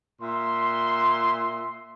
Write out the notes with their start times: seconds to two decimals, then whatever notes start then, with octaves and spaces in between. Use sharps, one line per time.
0.21 A#2 E5 C6